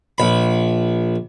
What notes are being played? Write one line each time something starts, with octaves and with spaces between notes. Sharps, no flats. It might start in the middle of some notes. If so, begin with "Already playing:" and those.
A#1 B5